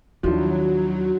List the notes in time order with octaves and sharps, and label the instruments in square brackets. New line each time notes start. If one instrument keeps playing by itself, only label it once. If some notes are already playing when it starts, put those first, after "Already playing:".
[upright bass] D#2 D#3 [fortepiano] F3 [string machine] F#3 [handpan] D4 E4